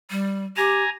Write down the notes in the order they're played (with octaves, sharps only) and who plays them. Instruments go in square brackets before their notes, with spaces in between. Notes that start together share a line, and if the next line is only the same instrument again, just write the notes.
[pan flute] G3
[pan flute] G4 [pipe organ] G#5 A#5